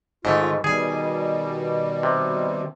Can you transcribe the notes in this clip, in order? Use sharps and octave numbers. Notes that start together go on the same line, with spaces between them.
G#2 D#3 A3 F4 C#5 D#5
B2 D#3 G3 G#4 G#5
C3